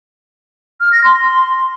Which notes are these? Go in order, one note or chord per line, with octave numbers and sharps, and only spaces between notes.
F6
A#6
C6